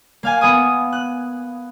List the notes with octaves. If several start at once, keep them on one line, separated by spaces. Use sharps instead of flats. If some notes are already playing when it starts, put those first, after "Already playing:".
A#3 F5 G#5
B3 G#5 D#6
F#6